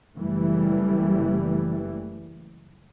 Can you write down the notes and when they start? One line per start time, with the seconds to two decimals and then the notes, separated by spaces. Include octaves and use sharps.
0.18 F#1 E3 G3 A3